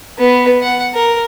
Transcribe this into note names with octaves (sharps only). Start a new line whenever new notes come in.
B3
F#5
A#4